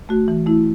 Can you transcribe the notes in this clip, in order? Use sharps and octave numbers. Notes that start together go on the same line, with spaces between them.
A3 F#4
E3
A3 E4